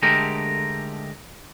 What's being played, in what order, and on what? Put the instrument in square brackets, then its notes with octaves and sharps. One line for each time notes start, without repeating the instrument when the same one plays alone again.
[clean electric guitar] D3 G#3 A3 G4 A#4